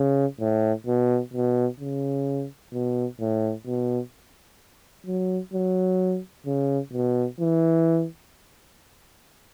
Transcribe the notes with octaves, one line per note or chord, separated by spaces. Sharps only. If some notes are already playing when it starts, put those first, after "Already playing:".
Already playing: C#3
A2
B2
B2
C#3
B2
A2
B2
F#3
F#3
C#3
B2
E3